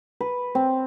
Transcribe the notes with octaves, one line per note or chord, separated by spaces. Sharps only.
B4
C4